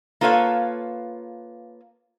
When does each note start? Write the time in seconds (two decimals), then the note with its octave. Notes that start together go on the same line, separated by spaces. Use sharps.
0.21 A#3 F4 A4 B4 C#5 F5